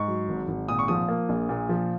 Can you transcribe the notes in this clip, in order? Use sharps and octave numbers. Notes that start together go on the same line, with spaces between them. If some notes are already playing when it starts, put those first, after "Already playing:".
Already playing: G#2 C#6
F#3
G#1
G#1
A#2 D#6
C#6
F3 D#6
A#3
A#1
A#2
F3